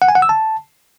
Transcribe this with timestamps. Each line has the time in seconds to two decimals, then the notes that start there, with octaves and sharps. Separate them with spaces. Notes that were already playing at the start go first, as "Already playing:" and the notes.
0.02 F#5
0.08 G#5
0.15 F#5
0.22 E6
0.29 A5